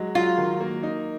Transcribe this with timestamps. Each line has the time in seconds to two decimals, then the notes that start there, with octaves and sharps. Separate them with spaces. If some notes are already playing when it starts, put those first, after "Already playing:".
Already playing: F#3 G#3
0.15 F#3 F4
0.38 D#3
0.60 A#3
0.83 D#4